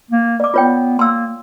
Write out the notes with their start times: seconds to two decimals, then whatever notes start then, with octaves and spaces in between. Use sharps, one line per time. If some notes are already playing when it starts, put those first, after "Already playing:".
0.11 A#3
0.40 D5 D6
0.54 B3 F4 C#5 G5
0.99 A#3 C6 E6